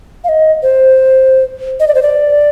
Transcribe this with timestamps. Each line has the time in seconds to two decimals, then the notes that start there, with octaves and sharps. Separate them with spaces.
0.24 F5
0.29 D#5
0.63 C5
1.80 D#5
1.88 D5
1.95 C5
2.02 D5